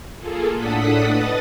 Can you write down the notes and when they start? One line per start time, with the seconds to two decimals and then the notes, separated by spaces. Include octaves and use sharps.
0.17 A#3 F4 G#4 A4
0.53 A2 D4 A4 F#5 D#6 B6
1.06 B4 D#5 A6